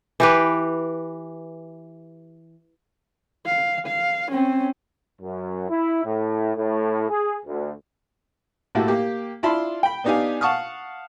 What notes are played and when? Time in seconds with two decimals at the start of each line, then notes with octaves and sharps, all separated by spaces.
0.20 E3 G4 B4
3.46 F5
3.87 F5
4.31 C4 C#4
5.22 F#2
5.70 E4
6.05 A2
6.56 A2
7.10 G#4
7.46 D2
8.75 A2 A3 A#3 E4 F#4 G4
8.88 A#3 G4
9.43 D4 E4 F4 A5 B5 C6
9.83 G5 B5
10.04 B3 D4 D#4 G4 F5 G#5
10.41 F5 F#5 A5 C#6 D#6 F6